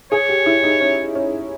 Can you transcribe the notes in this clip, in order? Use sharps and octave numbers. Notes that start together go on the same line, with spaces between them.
G#4 C#5
G4
E4
D#4
C#4
C#4